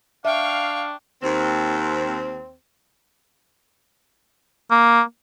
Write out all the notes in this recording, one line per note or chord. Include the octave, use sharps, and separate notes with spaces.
D4 E5 F5 G5 C#6
D#2 C4
A#3